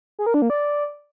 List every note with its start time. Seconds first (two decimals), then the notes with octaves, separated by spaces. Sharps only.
0.19 G#4
0.26 A#4
0.34 D4
0.42 A#3
0.50 D5